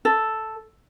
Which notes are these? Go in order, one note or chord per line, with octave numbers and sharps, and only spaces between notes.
A4